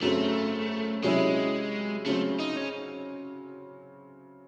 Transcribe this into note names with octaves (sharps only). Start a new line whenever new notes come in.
F#2 C#3 F#3 A3 C4
C3 F#3 G#3 C#4 E4
C#3 F#3 A3 C4
D#4
C#4